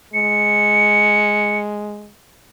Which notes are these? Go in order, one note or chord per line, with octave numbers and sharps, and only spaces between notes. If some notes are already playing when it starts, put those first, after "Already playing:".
G#3 C#7